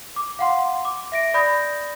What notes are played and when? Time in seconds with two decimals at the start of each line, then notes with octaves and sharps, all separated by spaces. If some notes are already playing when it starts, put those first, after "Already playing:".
0.16 D6
0.39 F5 F#5 C6
0.85 D6
1.12 E5 A#6 D7
1.34 D5 B5 D#6 G6 A#6